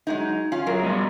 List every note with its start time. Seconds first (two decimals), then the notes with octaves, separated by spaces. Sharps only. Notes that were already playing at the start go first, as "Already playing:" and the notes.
0.07 F#3 G#3 D#4
0.52 C#4 F4
0.66 F#2 F#3 G#4 A#4
0.83 B2 G3 D#5